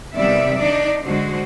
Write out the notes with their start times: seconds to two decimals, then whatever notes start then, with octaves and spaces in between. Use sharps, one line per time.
0.14 C3 D#3 G3 B3 D5 E5
0.55 D4 D#4 D5
1.03 D3 G#3 F#4 C5